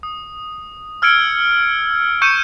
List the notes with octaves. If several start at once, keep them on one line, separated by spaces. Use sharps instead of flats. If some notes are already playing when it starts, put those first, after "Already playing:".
D#6
E6 F6 G#6 C#7 D7
C#6 G6 C#7 D#7 E7